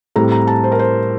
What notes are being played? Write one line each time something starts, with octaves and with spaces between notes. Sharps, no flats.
A2 G3 C4 A#5
A#5
A5
C5
A#4
C5